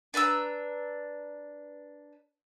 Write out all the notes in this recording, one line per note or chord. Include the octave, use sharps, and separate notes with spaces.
D4 B4 A#5 E6